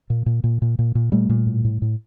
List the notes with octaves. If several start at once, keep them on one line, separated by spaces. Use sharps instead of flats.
A#2
A#2
A#2
A#2
A#2
A#2
A#2 G3 A3
A#2
A2
A2
A2